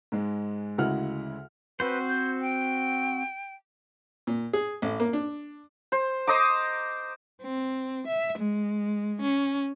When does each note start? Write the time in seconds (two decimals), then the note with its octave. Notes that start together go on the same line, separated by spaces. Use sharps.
0.12 G#2 G#3
0.78 D2 C#3 G#3 E4 F#5 F6
1.80 C4 F#4 B4 C5
2.08 G6
2.41 G5
4.27 A#2
4.53 G#4
4.82 A1
5.00 A#3
5.13 D4
5.92 C5
6.27 C5 D#5 A#5 D6
7.42 C4
8.07 E5
8.39 G#3
9.22 C#4